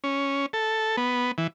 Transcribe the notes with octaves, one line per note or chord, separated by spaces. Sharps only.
C#4
A4
B3
E3